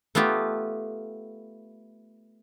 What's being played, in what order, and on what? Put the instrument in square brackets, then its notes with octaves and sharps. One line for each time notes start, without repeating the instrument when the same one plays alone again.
[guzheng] A3 B3 F4 G4